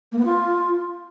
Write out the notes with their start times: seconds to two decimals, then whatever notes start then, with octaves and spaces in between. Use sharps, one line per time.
0.12 A#3
0.18 B3
0.25 F4